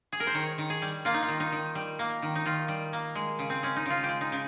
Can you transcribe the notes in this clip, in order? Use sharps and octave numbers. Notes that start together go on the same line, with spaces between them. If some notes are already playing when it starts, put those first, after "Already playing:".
G#4
A#4
C5
D#3 C#5
D#3
G#4
G3
A#3 F4
D#4
F4
D#3
D#4
D#3
G3
A#3
D#3
D#4
D#3 F4
G3
A#3
G#3
C#3
C4
G#3 C#4
D#4
C#3 F4
G4
G#3
D#4
C#3